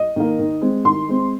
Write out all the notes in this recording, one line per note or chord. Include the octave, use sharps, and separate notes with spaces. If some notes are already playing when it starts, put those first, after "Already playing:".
Already playing: D#5
D#3 A#3
D#3
G#3 C4
D#3 C6
G#3 C4